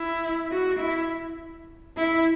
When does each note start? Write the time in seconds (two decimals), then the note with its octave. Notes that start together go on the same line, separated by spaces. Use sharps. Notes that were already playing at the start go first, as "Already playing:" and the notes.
Already playing: E4
0.51 F#4
0.79 E4
1.97 E4